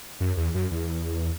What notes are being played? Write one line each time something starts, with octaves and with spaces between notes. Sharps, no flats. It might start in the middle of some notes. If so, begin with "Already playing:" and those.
F#2
E2
F#2
E2